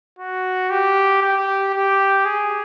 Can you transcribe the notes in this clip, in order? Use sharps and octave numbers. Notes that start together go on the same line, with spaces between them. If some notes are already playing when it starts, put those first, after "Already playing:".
F#4
G4
G4
G4
G#4